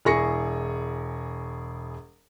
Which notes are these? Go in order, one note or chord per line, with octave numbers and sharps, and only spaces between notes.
E1 E4 G#4 C#6 A#6 C#7